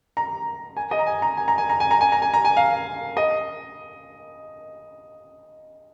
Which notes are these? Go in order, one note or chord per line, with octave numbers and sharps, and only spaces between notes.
A#5
G#5
D#5
A#5
G#5
A#5
G#5
A#5
G#5
A#5
G#5
A#5
G#5
A#5
G#5
A#5
G#5
F5
D#5